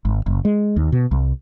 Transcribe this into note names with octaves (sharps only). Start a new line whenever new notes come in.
G#1
F#1
G#3
D#2
B2
C2